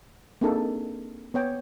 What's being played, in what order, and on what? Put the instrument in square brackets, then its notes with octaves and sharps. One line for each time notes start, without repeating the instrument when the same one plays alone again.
[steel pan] A#3 C4 D4 D#4 G#4 A4
B3 C#5 G5